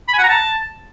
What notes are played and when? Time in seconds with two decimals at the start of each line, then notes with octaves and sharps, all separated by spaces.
0.08 B5
0.13 G#5
0.19 F#5
0.24 A#5
0.29 A5